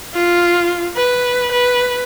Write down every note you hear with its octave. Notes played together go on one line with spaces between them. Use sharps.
F4
B4
B4